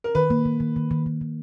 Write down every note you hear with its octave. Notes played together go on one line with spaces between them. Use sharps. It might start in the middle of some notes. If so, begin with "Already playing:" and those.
A#4
D#3 B4
A#3
D#3
D#3
D#3
D#3
D#3
D#3